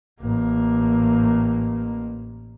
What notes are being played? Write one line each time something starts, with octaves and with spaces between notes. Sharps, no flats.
A1 A#3